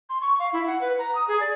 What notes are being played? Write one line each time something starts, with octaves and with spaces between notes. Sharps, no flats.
C6
C#6
F5
E4
F#5
B4
A#5
D#6
G#4
D5